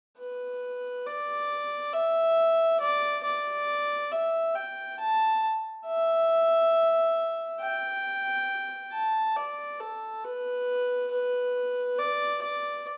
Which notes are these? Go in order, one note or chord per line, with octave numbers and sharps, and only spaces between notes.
B4
D5
E5
D5
D5
E5
G5
A5
E5
G5
A5
D5
A4
B4
B4
D5
D5